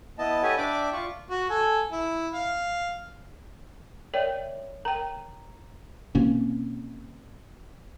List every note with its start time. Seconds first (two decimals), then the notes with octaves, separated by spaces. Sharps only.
0.18 B3 E4 D#5 A5
0.42 G4 A4 B4 C#5 F#5 G#5
0.58 D4 D5 E5 G5 D6
0.93 F4 C#6
1.30 F#4
1.50 A4 G#5
1.92 E4
2.34 F5
4.14 A#4 C#5 D5 E5 G5
4.85 A#4 G5 A#5
6.15 B2 A#3 C4 C#4